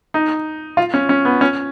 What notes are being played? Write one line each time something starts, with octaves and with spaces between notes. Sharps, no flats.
D#4
F4
C#4
C#4
B3
C#4